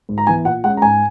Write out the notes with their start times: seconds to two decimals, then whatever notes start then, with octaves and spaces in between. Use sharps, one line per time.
0.09 G#2
0.18 A#5
0.27 E3 B3 G#5
0.45 A#2 F#5
0.64 G#3 C#4 F#5
0.77 A#5
0.82 G#2 G#5